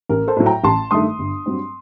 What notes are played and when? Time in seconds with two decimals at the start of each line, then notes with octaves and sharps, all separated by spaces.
0.09 A1 A#4
0.28 A4 C5
0.37 A2 F#3
0.46 G5 A#5
0.64 A1 A5 C6
0.91 G2 D#3 A3 C6 D#6
1.19 G1
1.46 G2 F#3 C4